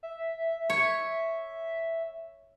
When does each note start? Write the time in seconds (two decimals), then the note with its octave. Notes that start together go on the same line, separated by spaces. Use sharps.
0.03 E5
0.70 C#5